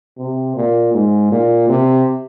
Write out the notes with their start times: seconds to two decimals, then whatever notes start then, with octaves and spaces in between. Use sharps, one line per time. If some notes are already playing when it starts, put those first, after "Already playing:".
0.18 C3
0.56 A#2
0.94 G#2
1.31 A#2
1.69 C3